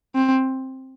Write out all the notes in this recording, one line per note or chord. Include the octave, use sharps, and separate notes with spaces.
C4